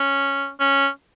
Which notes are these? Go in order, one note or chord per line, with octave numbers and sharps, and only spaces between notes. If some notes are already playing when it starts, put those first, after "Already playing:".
Already playing: C#4
C#4